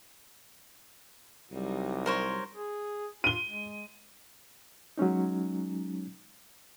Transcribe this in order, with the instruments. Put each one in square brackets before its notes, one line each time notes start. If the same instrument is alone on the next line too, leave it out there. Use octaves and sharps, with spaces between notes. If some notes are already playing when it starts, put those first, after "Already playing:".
[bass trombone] C2 [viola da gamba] F#3 G3 D#4
[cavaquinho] A#4 C5 C#5
[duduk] G#4
[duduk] F4 [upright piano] D#7 G7
[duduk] G#3
[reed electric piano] F#3 G#3 C#4 D#4